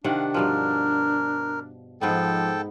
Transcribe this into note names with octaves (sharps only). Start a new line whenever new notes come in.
C3 D#3 D4 F5 F#5
G2 B2 F3 A#4
G#2 F3 B3 D#4 A4 G5